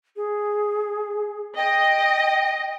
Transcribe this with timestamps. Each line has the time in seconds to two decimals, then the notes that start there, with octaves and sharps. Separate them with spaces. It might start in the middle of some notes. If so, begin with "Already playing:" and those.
0.16 G#4
1.57 D#5 G5